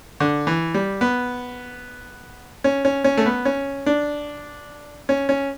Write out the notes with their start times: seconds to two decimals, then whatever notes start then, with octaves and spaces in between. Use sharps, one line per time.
0.20 D3
0.47 E3
0.74 G3
1.01 B3
2.64 C#4
2.85 C#4
3.04 C#4
3.17 A3
3.26 B3
3.45 C#4
3.86 D4
5.09 C#4
5.29 C#4